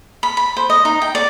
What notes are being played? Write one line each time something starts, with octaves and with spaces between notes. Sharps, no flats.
B5
B5
C5
D#5
D#4
G5
D5